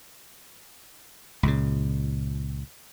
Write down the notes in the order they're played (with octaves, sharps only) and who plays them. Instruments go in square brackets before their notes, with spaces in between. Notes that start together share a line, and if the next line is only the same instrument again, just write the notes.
[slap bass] C#2 A#2 C#3